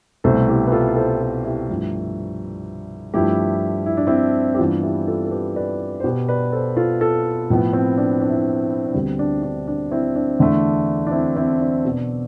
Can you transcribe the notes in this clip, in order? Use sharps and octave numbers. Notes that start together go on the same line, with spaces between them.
C2 B2 A3 A4 C5
E4 G4
B4
F4 A4
A4 C5
F4 A4
E4 G4
G2 F3 A3
G2 F3 A3 E4 G4
E4
D4
C4 E4
G4
G2 E3 B3 D4 F4
E4 G4
F4 A4
A4
G4 B4
B4 D5
C5
B2 B3 G4 B4
B4 D5
A4 C5
F4 A4
F4 A4
A2 F3 B3
C4
D4
D4
E4
D4
D4
D2 D3 G3 B3 C4
D4
D4
D4
C4 E4
D4
E2 D3 A3
D4
C4 E4
C4 E4
D4
B2 B3